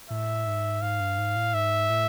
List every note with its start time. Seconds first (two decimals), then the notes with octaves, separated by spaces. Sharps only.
0.10 A2 E5
0.47 G#2
0.82 G#2 F5
1.00 G2
1.18 G#2
1.36 A2
1.54 G#2 E5
1.90 A2